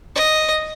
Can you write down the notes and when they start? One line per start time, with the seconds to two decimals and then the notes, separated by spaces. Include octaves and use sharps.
0.16 D#5